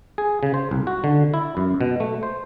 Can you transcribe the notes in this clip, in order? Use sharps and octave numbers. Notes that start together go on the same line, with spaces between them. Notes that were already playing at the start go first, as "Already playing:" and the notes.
G#4
C#3
C5
C2
F#4
D3
E4
F#2
B2
A3
C5